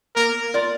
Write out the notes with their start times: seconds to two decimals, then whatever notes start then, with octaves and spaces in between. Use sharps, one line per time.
0.16 A#3 A#4
0.54 F4 A#4 D5